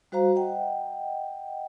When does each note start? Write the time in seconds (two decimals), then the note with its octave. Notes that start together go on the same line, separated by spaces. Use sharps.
0.12 G3 F#4 C5 F5 A#5
0.35 D#5 F#5 G5